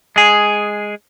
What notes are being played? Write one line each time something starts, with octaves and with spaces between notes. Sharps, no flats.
G#3 G#4